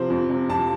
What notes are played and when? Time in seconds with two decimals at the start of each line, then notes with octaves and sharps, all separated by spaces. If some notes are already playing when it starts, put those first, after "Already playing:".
Already playing: C3 F3 C5
0.10 F2
0.30 C3
0.49 F2 A5